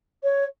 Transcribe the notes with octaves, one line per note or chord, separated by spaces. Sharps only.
C#5